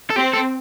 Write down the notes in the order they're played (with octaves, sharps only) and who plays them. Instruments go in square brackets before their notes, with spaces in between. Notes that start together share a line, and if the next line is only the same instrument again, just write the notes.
[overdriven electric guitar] A4
[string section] C4 [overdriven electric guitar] G4
[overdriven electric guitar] A4